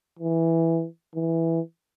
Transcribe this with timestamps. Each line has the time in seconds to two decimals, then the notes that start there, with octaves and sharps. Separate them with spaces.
0.19 E3
1.15 E3